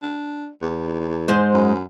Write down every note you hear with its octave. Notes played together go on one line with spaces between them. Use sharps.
D4
E2
G#2 G#3 C5
F#2